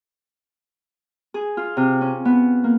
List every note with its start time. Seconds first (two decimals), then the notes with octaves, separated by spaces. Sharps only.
1.34 G#4
1.57 F4
1.77 C3
2.01 C#4
2.25 B3
2.64 A#3